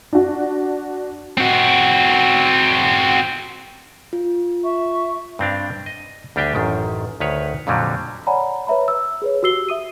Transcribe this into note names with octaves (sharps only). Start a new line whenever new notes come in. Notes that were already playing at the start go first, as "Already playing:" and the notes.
D4 F#4
C4 F#4
F4
E5 C#6
G2 C4 D4 F5
D#5
D2 G3 D4 G4 G5 G#5
A1 F#2 D#3
D2 D#3 B4 C#5
F2 A#2 D3 F#3 G3
C#5 D5 F#5 G#5 A#5 B5
B4 C#5 E5 A#5 B5
E6
G#4 B4 C#5
F#4 G4 E6 C7 G7
E5 D#6 D#7